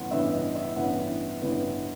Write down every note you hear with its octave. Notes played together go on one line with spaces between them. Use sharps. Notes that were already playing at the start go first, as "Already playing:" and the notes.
Already playing: A1 G2 E3 B3 F#5 C6
A1 G2 E3 B3 E5
D#5
E5
A1 G2 E3 B3 F#5
A1 G2 E3 B3